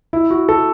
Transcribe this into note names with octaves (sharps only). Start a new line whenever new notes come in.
E4
F#4
A4